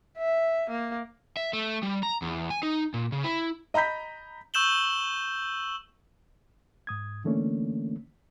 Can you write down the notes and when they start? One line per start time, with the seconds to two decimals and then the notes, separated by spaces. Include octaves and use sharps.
0.18 E5
0.70 A#3
1.37 E5
1.53 A3
1.83 G3
2.03 A#5
2.22 E2
2.50 G#5
2.63 D#4
2.94 A#2
3.12 C#3
3.24 E4
3.74 D#5 A#5 B5 G6 B6
4.54 C#6 E6 G6 E7 F#7 G7
6.87 G#2 D#6 G#6
7.24 D3 E3 A3 A#3 C#4 D4